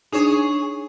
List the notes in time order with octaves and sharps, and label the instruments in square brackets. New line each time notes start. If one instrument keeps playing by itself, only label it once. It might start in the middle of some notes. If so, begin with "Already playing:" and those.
[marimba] D4 D#4 [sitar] G#4 C#5